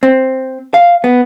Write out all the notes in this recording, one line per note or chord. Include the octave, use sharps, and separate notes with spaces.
C4
F5
B3